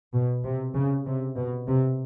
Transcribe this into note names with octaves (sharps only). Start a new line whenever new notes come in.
B2
C3
C#3
C3
B2
C3